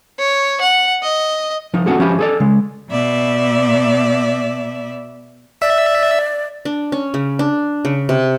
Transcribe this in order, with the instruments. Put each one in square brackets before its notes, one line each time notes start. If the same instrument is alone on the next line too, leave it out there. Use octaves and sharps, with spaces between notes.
[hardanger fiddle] C#5
F#5
D#5
[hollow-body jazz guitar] F3 D#4
B3 C#4 F#4 G#4 A4
F3 C#4 G4 E5 B5
G#4 A4 D5
C#3 G#3
[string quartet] B2 D5 E5
[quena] D5 [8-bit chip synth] E5
[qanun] D4
C#4
C#3
D4
C#3
C3